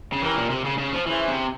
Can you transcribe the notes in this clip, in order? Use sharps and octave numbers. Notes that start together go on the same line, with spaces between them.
C#3
E3 C#4 G4 A#4
A#2
C3
C#3
C#3
F3
E3 C#4 E4 G#4 C5 E5
C3